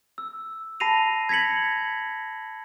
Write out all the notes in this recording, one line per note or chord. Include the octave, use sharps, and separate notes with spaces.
E6
A5 B5 A#6 C7 D#7 F7
G#6 A#6 B6 C#7 F#7